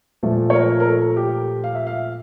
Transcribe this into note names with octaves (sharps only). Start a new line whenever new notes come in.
A#2 F3 A3
C#5
A#4
A#4
A4
G4
F5
E5
F5